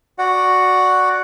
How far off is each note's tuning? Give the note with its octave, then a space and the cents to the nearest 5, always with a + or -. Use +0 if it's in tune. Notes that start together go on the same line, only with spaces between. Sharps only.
F#4 +0 D5 +0 F#5 +0